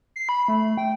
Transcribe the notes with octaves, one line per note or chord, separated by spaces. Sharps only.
C7
B5
A3
G5